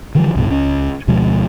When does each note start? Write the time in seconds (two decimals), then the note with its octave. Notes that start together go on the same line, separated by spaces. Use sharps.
0.15 D3 E3 F3 G3
0.35 C2 G2 B2
0.50 C#2 C#4
1.08 D2 B2 F3 G#3